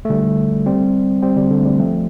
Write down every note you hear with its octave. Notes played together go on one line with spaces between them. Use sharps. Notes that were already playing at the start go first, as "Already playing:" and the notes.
A3
D3 G3
G3 C4
G3 C4
D3 G3
D3
A3
D3 G3
F3 A3